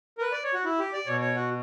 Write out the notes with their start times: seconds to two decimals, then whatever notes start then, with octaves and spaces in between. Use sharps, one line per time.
0.18 A#4
0.22 B4
0.32 D5
0.44 C#5
0.54 F#4
0.65 E4
0.79 G4
0.93 D5
1.07 B2 C#5
1.21 C#5
1.35 F#4